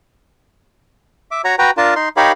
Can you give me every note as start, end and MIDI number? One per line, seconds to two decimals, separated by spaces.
1.31 1.42 76
1.31 1.42 86
1.44 1.55 66
1.44 1.55 73
1.44 1.55 82
1.59 1.71 66
1.59 1.71 71
1.59 1.71 79
1.59 1.71 82
1.77 1.94 62
1.77 1.94 65
1.77 1.94 70
1.77 1.94 81
1.96 2.09 63
1.96 2.09 84
2.17 2.32 63
2.17 2.32 67
2.17 2.32 70
2.17 2.32 73
2.17 2.32 77
2.17 2.32 83